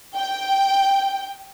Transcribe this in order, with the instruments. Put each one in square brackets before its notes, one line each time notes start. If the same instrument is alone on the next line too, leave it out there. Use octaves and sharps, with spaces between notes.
[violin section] G5